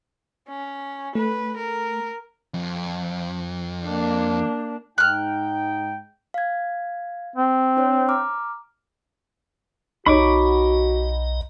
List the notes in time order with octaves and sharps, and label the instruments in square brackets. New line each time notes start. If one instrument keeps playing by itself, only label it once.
[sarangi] C#4
[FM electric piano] A3 [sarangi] B4
[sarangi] A#4
[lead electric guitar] F2
[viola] A#3 D4
[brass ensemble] G#2 D#4 G5 [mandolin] F6 F#6
[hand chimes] F5 G#6
[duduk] C4
[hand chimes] D4 C5 C#5
A#5 D6 F6
[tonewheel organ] B1 D#5 [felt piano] D#4 C#5 [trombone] F#4 [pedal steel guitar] B5 C#6 D6